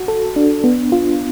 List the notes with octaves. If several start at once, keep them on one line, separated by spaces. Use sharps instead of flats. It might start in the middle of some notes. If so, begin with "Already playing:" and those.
Already playing: F#4
A4
D4
B3
F4